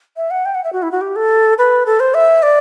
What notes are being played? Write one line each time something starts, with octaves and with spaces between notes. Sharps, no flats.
E5
F#5
G5
F#5
E5
F#4
E4
F#4
G4
A4
B4
A4
C5
E5
D5